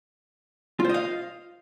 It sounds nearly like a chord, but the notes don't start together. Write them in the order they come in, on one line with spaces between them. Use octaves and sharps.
F4 C5 D#5 F5